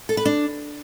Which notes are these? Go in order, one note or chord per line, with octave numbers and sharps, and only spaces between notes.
A4
B4
D4